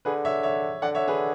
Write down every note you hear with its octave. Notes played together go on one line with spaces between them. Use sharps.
D3 G#4 B4
C#5 E5
C#5 E5
D3 D5 F#5
C#5 E5
G#4 B4